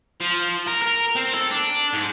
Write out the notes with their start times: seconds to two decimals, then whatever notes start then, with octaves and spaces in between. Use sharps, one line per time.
0.21 F3
0.67 A#4
0.82 A#4
1.16 C4
1.34 A4
1.51 D4
1.93 G#2